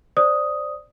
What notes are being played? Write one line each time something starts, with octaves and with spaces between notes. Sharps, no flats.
C5 D5 D#6